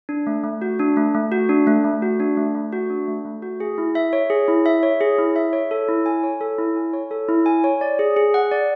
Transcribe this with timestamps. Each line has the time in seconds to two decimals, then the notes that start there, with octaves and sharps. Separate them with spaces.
0.09 D4
0.27 A3
0.44 A3
0.62 F#4
0.79 D4
0.97 A3
1.14 A3
1.32 F#4
1.49 D4
1.67 A3
1.84 A3
2.02 F#4
2.20 D4
2.37 A3
2.55 A3
2.72 F#4
2.90 D4
3.08 A3
3.25 A3
3.42 F#4
3.60 G#4
3.78 E4
3.95 E5
4.13 C#5
4.30 G#4
4.48 E4
4.66 E5
4.83 C#5
5.01 G#4
5.18 E4
5.36 E5
5.53 C#5
5.71 A4
5.88 E4
6.06 G#5
6.23 C#5
6.41 A4
6.58 E4
6.76 G#5
6.93 C#5
7.11 A4
7.29 E4
7.46 G#5
7.64 C#5
7.81 D5
7.99 G#4
8.17 G#4
8.34 F#5
8.52 D5